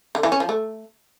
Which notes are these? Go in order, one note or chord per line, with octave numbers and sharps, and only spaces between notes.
D3
E3
C#4
F3
A3